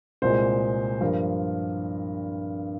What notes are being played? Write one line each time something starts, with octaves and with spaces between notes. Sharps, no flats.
C2 A#2 G#3 C5
G2 F3 A#3 A#4